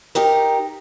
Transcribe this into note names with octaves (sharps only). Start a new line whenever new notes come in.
D#4 G4 A#4